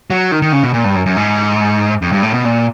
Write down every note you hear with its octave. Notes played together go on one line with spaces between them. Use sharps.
F#3
D#3
D#3
C#3
B2
A#2
G2
F#2
F#2
G#2
F2
G2
A2
B2
A#2